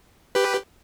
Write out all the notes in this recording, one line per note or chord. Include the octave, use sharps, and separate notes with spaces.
G4 B4